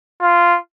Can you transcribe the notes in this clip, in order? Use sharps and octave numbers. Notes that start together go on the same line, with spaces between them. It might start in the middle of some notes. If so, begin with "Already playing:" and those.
F4